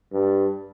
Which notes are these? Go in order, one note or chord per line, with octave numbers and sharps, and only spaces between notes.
G2